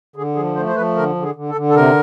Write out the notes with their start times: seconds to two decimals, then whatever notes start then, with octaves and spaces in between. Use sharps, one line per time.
0.16 D3 G#4
0.35 F3 G#4
0.56 A3 C5
0.66 C5
0.76 F3 B4
0.96 D3 A#4
1.15 D3
1.22 G#4
1.35 D3
1.49 A4
1.55 D3
1.69 A4
1.75 C3 A#4